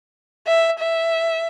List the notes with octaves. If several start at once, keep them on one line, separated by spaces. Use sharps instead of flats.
E5
E5